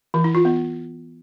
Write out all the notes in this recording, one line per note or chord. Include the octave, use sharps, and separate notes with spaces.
E3
E4
F4
B3